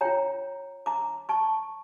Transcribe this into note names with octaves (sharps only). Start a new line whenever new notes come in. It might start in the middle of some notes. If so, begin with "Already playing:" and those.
F4 C#5 G5 A#5
A#5 D6
A5 C#6